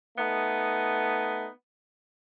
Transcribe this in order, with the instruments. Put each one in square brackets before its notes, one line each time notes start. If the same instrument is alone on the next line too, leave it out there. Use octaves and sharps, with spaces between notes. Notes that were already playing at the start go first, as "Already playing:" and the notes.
[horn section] A3 B3 D#4